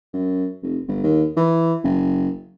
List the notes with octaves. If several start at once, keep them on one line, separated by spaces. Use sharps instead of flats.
F#2
F1
G1
D#2
E3
F#1